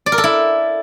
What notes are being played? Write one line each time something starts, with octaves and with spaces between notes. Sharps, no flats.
D5
A#4
A4
E4